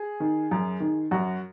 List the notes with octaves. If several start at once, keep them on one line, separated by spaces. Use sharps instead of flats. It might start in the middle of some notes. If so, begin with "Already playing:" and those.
Already playing: G#4
D#3
F#2
D#3
F#2 F#4